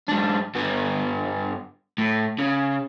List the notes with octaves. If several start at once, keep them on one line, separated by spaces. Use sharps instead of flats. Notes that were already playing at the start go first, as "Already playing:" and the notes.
G#2 D4
G2 B3
A2
C#3